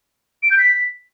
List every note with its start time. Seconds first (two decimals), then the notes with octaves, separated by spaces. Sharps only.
0.43 D7
0.51 G6
0.59 B6